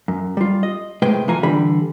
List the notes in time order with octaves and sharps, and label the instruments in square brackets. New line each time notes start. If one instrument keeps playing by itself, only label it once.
[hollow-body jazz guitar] F#2
G3 F4
D#5
A2 C3 G#3 B4 G5
F2 E3 F4 G#5 A#5
D3 E3 G3 G4 G#5 B5